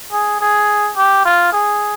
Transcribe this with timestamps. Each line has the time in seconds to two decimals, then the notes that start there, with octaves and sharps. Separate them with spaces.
0.13 G#4
0.41 G#4
0.97 G4
1.25 F4
1.52 G#4